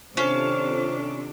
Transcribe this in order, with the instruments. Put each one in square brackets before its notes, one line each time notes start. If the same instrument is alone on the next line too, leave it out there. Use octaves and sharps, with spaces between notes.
[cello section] C3 D#3 D4 [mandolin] C#4 [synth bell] F4 A4 [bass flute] C5